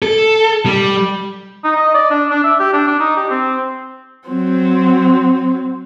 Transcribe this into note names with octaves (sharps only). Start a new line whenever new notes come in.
A4
G3
D#4
D#5
D5
D4
D4
E5
G4
D4
D4
D#4
G4
C4
F#3 C4